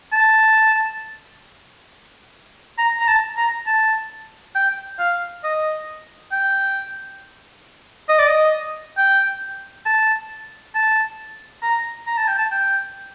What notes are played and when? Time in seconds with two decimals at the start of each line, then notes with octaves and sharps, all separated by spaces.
0.13 A5
2.78 A#5
2.99 A#5
3.08 A5
3.37 A#5
3.67 A5
4.55 G5
4.99 F5
5.44 D#5
6.32 G5
8.09 D#5
8.19 D5
8.28 D#5
8.97 G5
9.86 A5
10.75 A5
11.62 A#5
12.07 A#5
12.17 A5
12.28 G5
12.38 A5
12.51 G5